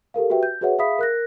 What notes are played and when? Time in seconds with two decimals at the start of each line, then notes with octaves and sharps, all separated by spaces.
0.14 G4 A4 A#4 F5
0.30 F#4 G4 B4 E5 G5
0.43 G6
0.61 F#4 G#4 B4 C#5 E5 F#5
0.78 G#4 E5 F5 B5 D#6 B6
0.99 A#4 F#6 A#6